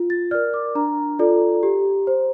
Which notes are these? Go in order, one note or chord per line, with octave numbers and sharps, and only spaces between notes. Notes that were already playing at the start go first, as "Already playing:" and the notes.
Already playing: F4
A6
A#4 D5 F6
D6
D4 A#5
F4 A4 D5
G4
C5